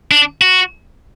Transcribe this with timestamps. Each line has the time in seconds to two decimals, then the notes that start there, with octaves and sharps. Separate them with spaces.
0.11 D4
0.41 F#4